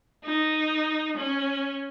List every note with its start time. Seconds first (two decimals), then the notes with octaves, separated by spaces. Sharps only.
0.24 D#4
1.17 C#4